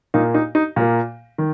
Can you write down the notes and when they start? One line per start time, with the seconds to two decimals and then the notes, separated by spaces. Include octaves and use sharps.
0.14 A#2 A#3 D#4
0.34 D#4
0.55 D#4
0.76 A#2 A#3
1.38 D#3